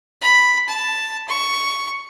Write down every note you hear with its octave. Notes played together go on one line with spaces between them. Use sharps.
B5
A5
C#6